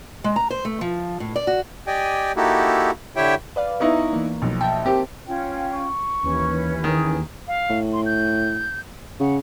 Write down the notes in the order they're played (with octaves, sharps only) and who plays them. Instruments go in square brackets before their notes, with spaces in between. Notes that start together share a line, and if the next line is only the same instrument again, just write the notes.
[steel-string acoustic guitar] G#3
A#5
C5
A3
F3
A2
D5
F#4
[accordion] G4 D5 D#5 G5 G#5
A#3 D#4 E4 F#4 G4 A4
D3 E4 G4 C#5 E5 G5
[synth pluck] B4 D5 F5
[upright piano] B3 D#4 E4 [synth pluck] A#5 C#6
[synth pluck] E3 A#3
[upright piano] B1 [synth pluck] F3
[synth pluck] E5 G5 A5
[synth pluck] C4 A#4 C5 [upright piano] G4
[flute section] C#4 F4 G5
[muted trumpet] C#6
[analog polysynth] D#2 E3 [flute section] C#4 E4 B4
[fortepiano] D#3 [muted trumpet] G#4
[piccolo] F5
[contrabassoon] A2
[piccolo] C6
G6
[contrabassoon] C#3 [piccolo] F#5